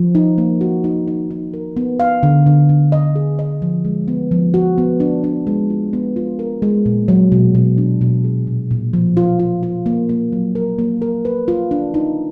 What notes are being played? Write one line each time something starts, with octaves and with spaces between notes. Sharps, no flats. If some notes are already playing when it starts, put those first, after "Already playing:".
Already playing: F3
D#4
A#3
F#4
D#4
D#4
D#4
A#4
B3
F5
D3
D3
D3
D#5
G#4
D#5
F3
G#3
B3
F3
F#4
B3
D4
D4
G#3
F4
B3
F4
A#4
G#3
A#2
F#3
B2
B2
D4
B2
G#4
A#2
A#2
F3
F4
F4
F4
A#3
A#3
F#3
A#4
A#3
A#4
B4
F4
D4
D#4